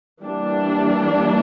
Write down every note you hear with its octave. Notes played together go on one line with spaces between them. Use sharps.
E3 G3 A#3 D4